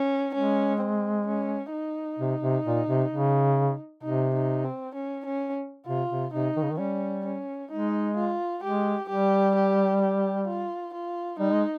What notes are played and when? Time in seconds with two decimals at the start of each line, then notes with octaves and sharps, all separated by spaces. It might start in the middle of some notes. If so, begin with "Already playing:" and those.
Already playing: C#4
0.34 G#3 C#4
0.80 C4
1.27 C#4
1.73 D#4
2.19 C3
2.42 C3
2.65 A#2
2.87 C3
3.10 C#3
4.02 C3 D#4
4.34 D#4
4.64 C4
4.94 C#4
5.25 C#4
5.87 C3 F4
6.10 C3
6.33 C3 D#4
6.56 D#3
6.63 C#3
6.71 D#3
6.79 G3 C#4
7.25 C#4
7.71 G#3 D#4
8.17 F4
8.63 G#3 G4
9.09 G3 G4
9.55 G4
10.01 G4
10.47 F4
10.93 F4
11.39 G3 D#4
11.52 G#3